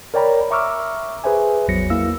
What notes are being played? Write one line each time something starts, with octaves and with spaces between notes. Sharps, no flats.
A#4 C#5 D5 G5 A#5 B5
E5 A#5 C#6 D6 E6 F6
G#4 B4 C5 E5 G#5
A1 E2 F#3 A#6 C#7
A#3 E4 F5 E6